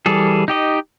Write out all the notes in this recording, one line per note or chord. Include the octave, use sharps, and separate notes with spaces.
E3 G3 G#4 A4
D#4 G4 D#5